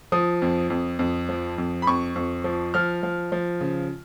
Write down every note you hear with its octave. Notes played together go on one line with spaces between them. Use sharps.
F3 D#6
F2
F2
F2
F3
F2
B5
F2 C#6
F2
F3
F3 F6
F3
F3
C#3